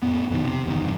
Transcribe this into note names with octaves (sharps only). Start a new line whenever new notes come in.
F2 A2 B3
F2 B2 D#3
C3
F#1 E2 A2 D#3
E2 G2 C3